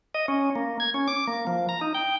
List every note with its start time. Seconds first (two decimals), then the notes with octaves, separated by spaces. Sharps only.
0.14 D#5
0.28 C#4
0.55 A#3
0.80 G#6
0.94 C#4
1.08 D6
1.27 A#3
1.47 F3
1.69 A#5
1.81 D#4
1.94 G5